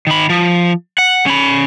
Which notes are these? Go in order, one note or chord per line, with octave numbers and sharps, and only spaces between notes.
D#3 B5
F3
F#5
C#4 B5